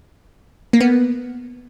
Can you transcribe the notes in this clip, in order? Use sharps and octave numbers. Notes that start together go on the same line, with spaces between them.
A#3
B3